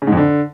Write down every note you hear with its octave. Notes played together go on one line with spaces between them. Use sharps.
C#3
G#2
F2
D3